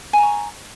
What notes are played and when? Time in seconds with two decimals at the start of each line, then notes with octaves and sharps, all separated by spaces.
0.13 G#5
0.18 A#5
0.23 C#6